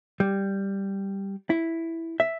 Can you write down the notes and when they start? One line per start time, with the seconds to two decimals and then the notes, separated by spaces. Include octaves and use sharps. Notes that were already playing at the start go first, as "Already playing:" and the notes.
0.20 G3
1.50 E4
2.20 E5